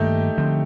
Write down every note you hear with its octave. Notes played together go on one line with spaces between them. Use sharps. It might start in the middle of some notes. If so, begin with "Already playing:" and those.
Already playing: G2 D#3 A3 A#3 D#4 G4
D3 F3 C4